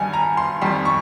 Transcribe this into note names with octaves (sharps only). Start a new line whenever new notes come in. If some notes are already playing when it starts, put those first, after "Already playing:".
Already playing: G2 D#3 G3 G#5
A#5
C6
F2 D#3 G3 C6
C#6